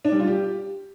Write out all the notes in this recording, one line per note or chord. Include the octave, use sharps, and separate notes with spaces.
D4
G3
F4
G4